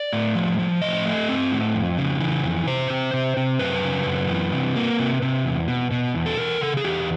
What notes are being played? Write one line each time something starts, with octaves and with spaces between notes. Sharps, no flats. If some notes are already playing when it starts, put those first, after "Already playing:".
Already playing: D5
A2
F3
F3
A2 D#5
A3
C4
A2
F2
C#3
E3
F2
C3 C5
C3
C3
C3
F#2 B4
C#3
F#2
E3
C3
A#3
C3
C3
E2
B2
B2
E2
A4
E2 A#4
C#3 A4
G#4
E2 G4